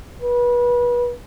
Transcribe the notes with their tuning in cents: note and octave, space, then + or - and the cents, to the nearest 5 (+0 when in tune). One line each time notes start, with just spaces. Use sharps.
B4 -30